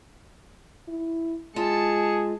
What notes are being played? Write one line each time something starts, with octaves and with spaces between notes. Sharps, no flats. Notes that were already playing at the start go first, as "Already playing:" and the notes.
E4
G#3 F4 G#4 D#5 E5 A5 C#7